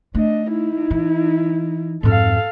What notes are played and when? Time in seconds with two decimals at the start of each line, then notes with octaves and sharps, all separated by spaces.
0.15 A3 D4 D#5
0.51 D#4 E4
0.91 E3
2.03 F2 G#2 A4 F5